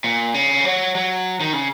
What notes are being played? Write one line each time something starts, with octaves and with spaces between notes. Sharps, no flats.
A#2
C#3
F#3
F#3
D#3
C#3